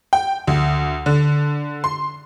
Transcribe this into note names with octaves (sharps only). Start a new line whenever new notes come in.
G5
D2
D3
C6